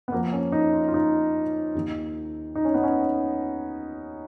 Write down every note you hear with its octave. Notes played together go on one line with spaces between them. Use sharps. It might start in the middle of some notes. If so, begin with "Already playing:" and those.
B3
F2 F3 A#3
C#4
D#4
F4
F4
D#4
D#2 D#3
D#4
C#4
B3
C#4